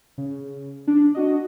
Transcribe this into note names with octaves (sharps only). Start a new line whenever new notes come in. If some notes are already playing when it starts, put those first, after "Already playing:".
C#3
D4
D4 F#4 D#5